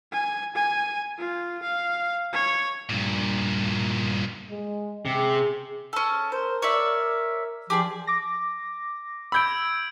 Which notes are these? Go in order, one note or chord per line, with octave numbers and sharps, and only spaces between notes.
G#5
G#5
F4
F5
C#5
G2 A#2
G#3
C3 G#4
C#4 A4
A#4 C5
C#5 D5 E5
F3 G4 G#4 D5
D6 A#6
B5 E6 G6 G#6 D7